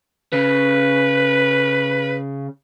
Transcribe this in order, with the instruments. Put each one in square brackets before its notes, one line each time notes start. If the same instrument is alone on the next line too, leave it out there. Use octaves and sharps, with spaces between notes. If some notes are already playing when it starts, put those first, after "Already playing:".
[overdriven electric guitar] C#3 [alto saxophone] B4